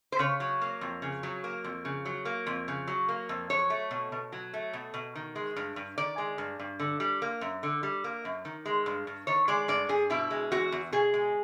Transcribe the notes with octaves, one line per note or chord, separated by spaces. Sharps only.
C5
C#3 C#5
F#3
A#3
F2
C#3
F#3
A#3
F2
C#3
F#3
A#3
F2
C#3
F#3
A#3
F2
F#3 C#5
A3
B2
B2
F#3
A3
B2
B2
D#3
G#3
G2
G2
D#3 D5
G#3
G2
G2
D3
G3
A#3
F#2
D3
G3
A#3
F#2
D#3
G#3
G2
G2
D#3 C#5
G#3 D5
G2 D5
G2 G#4
B2 E4
G#3
E2 F#4
E2
B2 G#4
G#3